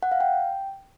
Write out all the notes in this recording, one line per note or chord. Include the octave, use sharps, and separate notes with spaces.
F#5
F5
G5